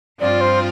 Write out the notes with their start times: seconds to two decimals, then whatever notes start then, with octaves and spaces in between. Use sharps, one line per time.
0.19 G2 F3 C4 F4 D5
0.41 C5